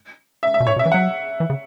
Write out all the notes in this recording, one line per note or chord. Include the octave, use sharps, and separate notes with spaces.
E5
E5
B2
A2 C#5
B2
E5
E3
F#3 F#5
E3
C#3